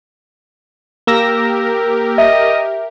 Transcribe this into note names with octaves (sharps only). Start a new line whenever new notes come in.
A#3 G4 A#4 E6 A#6
D#5 E5